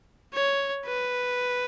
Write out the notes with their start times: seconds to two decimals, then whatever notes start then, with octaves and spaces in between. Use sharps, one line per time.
0.34 C#5
0.87 B4